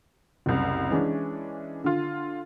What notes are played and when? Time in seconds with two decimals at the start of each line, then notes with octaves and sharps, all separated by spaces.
0.46 F#1 C2
0.91 E3 G#3 C#4 D4
1.84 D3 F4